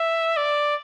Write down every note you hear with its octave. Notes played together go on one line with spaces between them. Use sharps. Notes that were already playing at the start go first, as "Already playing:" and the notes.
Already playing: E5
D5